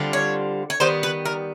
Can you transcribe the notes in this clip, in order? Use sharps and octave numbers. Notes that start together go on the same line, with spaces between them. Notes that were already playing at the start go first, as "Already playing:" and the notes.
Already playing: D3 G3 C4 F4
C#5
C#5
D#3 G3 B3 C5
B4
A#4